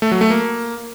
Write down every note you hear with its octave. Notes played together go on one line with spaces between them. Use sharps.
A3
F#3
A3
A#3